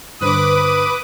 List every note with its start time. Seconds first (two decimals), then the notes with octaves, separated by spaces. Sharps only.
0.21 G2 D3 B4 C5 D6 D#6